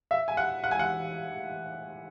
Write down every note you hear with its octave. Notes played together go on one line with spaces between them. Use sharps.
E5
G#5
F#5
F#5
G#5
F#5